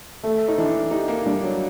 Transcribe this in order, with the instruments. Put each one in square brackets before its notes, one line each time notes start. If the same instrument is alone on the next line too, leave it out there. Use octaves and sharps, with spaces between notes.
[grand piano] A3
[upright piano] D#4
[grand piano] E3 [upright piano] D4
[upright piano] D#4 [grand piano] G4
[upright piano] A#3
[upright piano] G3 [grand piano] D4
[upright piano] F#3